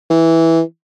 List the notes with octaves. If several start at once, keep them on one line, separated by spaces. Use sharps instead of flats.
E3